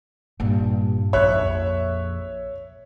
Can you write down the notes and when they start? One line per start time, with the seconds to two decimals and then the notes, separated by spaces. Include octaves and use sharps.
0.40 G2 A#2
1.13 A#1 F2 C#5 E5 F#6